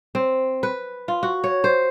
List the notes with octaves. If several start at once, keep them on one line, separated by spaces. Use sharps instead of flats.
C4
B4
F4
F#4
C#5
C5